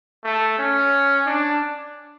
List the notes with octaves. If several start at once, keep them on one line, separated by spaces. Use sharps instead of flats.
A3
C#4
D4